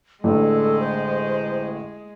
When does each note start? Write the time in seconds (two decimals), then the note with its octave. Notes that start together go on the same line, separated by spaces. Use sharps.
0.24 A1 D3 G#3 A4
0.80 C5